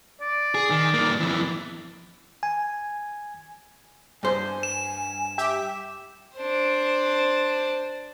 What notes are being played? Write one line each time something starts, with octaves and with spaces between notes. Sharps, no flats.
D5
G#4
D#3
G2 A#3
F2 E3
G#5
G2 C5 G#5
E7
G4 E5
D4 C5